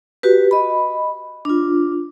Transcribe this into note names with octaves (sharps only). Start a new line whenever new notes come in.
F#4 G4 B4
D#5 B5
D4 F4